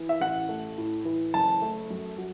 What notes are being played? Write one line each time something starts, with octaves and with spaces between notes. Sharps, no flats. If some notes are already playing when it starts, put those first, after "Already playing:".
Already playing: E3
E5
A1 F#5
A3
A2
E3
F#1 A5
A3
F#2
F#3